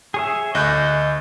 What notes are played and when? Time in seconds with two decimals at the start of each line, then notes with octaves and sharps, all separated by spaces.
0.14 G#4 C#5 E5
0.55 D2 D#5 F#6 G6